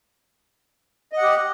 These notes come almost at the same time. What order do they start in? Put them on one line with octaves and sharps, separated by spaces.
D#5 F#5 G4